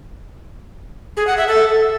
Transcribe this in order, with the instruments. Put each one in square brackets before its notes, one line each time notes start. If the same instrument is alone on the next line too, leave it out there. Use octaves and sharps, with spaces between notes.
[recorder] G#4
F#5
E5
A4